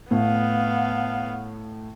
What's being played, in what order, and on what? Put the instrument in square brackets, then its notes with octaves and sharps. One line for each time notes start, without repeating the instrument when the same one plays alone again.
[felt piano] A2 [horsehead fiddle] B3 F5